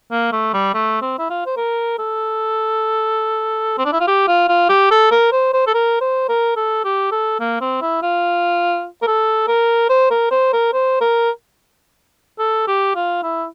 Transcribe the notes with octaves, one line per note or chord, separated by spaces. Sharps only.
A#3
A3
G3
A3
C4
E4
F4
C5
A#4
A4
C4
D4
E4
F4
G4
F4
F4
G4
A4
A#4
C5
C5
A4
A#4
C5
A#4
A4
G4
A4
A#3
C4
E4
F4
A#4
A4
A#4
C5
A#4
C5
A#4
C5
A#4
A4
G4
F4
E4